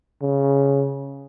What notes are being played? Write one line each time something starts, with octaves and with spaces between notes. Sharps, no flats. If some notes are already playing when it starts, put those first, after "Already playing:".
C#3